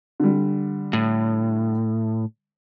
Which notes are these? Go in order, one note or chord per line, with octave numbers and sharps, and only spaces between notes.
D3 G3
A2